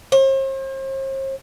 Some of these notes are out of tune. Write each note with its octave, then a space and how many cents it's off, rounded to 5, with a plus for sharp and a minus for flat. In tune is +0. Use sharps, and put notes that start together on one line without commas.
C5 +45